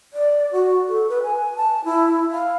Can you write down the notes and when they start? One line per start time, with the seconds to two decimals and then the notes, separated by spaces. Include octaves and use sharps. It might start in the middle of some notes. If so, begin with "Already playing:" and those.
0.13 D5
0.52 F#4
0.88 A4
1.09 B4
1.23 G#5
1.56 A5
1.85 E4
2.31 F5